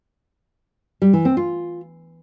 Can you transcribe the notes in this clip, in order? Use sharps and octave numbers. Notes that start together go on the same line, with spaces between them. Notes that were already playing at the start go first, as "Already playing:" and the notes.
G3
E3
C4
F4